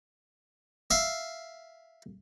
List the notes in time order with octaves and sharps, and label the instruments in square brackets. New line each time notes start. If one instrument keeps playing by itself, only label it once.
[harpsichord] E5 F5